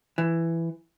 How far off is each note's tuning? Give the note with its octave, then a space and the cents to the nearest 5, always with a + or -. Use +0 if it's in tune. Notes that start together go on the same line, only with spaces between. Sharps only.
E3 +10